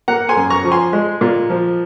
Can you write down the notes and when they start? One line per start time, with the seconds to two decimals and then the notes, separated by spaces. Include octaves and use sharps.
0.08 A#3 F#5 A#5
0.29 G#5 C6
0.36 F#2
0.50 A#5 C#6
0.64 F3
0.71 G#5 C6
0.93 G#3
1.21 A#2
1.50 F3